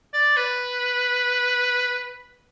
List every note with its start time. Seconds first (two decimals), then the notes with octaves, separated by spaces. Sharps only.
0.14 D5
0.37 B4